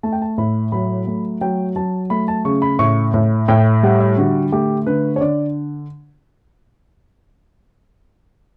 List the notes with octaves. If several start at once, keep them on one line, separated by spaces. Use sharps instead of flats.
A3 A5
G5
A5
A2 B5
F#3 B5
A3
F#3 G5
F#3 A5
A3 B5
A5
C#3 C#6
B5
A2 C#6
A2
A2 G5
G3 F#5
E5
D3 F#4
A3 G4
D3 B4
C#5
D3 D5